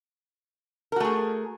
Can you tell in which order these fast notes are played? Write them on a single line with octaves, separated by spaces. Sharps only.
A#4 F#4 A3 G#4